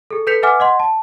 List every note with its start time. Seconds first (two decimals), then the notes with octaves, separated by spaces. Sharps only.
0.11 G#4 A4
0.27 A4 B4 G6 B6 C#7 F7
0.43 B4 E5 F#5 G#5 D6 F6
0.60 D#5 F#5 C6
0.80 A5